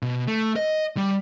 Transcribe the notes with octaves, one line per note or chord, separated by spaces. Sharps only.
B2
A3
D#5
G3